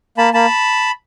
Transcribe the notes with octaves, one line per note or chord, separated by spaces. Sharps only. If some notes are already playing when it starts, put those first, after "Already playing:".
A#3 A5 B5
A#3 A5 B5